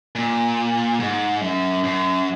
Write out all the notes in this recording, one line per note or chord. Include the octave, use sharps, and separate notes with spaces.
A#2
G#2
F#2
F#2